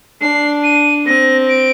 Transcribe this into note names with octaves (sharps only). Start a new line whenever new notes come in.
D4 C7
D#7
C4 A#6
D7